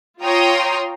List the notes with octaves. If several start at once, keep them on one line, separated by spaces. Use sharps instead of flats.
F4 C#5 G5 A#5 C6 D#6